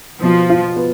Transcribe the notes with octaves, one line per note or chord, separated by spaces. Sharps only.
B2 F3
F4
B3